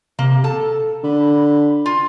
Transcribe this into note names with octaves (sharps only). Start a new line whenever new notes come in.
C3 A#3
A4 A5
D3 B5
F4